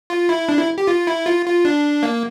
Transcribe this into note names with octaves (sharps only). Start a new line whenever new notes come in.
F4
E4
D4
E4
G4
F4
E4
F4
F4
D4
A#3